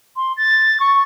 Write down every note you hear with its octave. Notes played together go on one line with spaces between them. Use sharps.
C6
A6
C#6